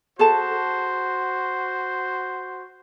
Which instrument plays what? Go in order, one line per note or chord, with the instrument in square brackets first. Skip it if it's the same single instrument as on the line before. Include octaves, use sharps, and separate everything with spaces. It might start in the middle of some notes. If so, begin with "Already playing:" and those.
[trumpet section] F#4 C5 [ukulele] G#4 A4 A5